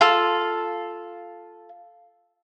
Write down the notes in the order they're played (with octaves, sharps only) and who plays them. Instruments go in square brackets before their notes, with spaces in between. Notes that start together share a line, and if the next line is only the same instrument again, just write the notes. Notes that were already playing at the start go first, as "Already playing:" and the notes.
[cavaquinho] F4 A4